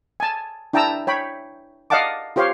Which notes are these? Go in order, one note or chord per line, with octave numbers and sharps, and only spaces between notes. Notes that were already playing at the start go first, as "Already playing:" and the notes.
G#5 A5
D4 E4 G5 A5 A#5 E6
C#5 G5 B5
D5 D#5 F5 F#5 A5 D6
F4 G4 C5 C#5 F5